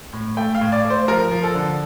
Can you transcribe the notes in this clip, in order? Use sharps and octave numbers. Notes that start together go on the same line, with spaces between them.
A2
A3 G5
F5
A2
D5
A3
C5
F3 A#4
F3
A4
D3